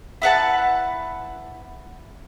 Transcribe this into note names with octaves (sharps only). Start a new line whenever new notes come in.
E4 B4 F#5 A5